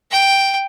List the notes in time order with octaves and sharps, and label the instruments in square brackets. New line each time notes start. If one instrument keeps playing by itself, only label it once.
[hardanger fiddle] G5